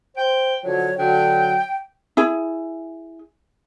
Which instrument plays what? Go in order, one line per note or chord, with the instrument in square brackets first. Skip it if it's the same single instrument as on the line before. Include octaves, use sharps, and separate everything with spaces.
[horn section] C5 G5
[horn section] D3 F3 F#3 [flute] C#5
[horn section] D3 F#3 [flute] G5
[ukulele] E4 G#4